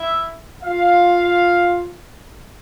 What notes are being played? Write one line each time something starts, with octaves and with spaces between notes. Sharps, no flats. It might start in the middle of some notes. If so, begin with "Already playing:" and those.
Already playing: E4 E5
F4 F5